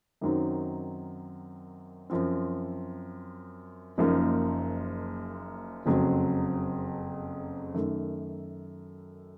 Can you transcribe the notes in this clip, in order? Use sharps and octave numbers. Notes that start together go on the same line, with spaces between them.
F#2 D#3 F#3 C4 D#4
F#2 F3 C4
F#1 F#2 F3 A#3 D#4
F#1 F2 C#3 F#3 C4
F#2 D#3 A3